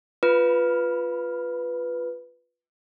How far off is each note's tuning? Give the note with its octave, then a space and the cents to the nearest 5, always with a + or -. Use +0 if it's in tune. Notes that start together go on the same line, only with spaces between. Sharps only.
F4 +0 B4 +0 B5 -25